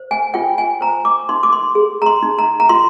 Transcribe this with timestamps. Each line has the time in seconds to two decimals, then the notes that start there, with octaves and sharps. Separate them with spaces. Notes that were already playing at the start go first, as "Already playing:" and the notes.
Already playing: C5
0.11 G#5
0.34 F4 G5
0.58 G#5
0.81 C5 A#5
1.05 D6
1.29 D#4 C6
1.43 D6
1.53 C6
1.75 G#4
2.02 A#5
2.06 C6
2.23 D#4
2.39 A#5
2.60 A#5
2.69 F4 C6